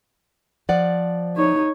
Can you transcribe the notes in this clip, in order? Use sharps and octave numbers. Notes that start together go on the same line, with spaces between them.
F3 D5 F#5
D#4 C#5